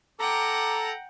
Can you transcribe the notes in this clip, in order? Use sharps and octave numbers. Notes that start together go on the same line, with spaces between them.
A4 F#5 G5 A#5 D6